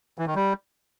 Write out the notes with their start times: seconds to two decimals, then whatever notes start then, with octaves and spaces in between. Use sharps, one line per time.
0.18 E3
0.27 D#3
0.35 G3